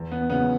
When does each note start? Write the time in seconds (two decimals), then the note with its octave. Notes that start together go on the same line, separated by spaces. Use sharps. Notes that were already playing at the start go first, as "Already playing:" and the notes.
Already playing: E2
0.12 B3
0.30 C#3 F#3 B3 C#4 E4